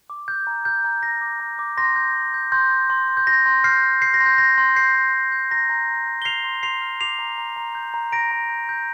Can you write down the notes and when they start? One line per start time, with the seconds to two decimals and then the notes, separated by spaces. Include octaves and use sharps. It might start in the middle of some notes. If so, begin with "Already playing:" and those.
0.10 D6
0.28 F6 G6
0.47 A#5
0.65 F6 G6
0.84 A#5
1.03 G6 A#6
1.21 D6
1.40 A#5
1.59 D6
1.77 C6 A#6
1.96 G6
2.14 C6
2.34 G6
2.52 C6 G6
2.71 C6
2.90 C6
3.08 C6
3.17 G6
3.27 C6 A#6
3.46 C6
3.64 F6 G6 C7
3.83 F6
4.01 G6 C7
4.14 A#6
4.20 C6
4.26 G6
4.38 C6 A#6
4.58 C6
4.76 G6 C7
4.95 C6
5.14 C6
5.32 G6
5.51 A#5 A#6
5.70 A#5
5.88 A#5
6.07 G6
6.22 G7
6.25 F6 C7 F7
6.44 C6
6.63 C6 C7 F7
6.82 F6
7.00 D6 C7 F7
7.19 A#5
7.38 A#5
7.57 A#5
7.75 G6
7.94 A#5
8.12 A#5 A#6 D7
8.32 A#5
8.50 G6
8.69 G6